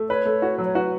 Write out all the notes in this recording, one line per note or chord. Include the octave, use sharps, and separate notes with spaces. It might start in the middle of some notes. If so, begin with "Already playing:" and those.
Already playing: A3
B4 C#5
A3
F#4
F#3
C#5
F#4 B4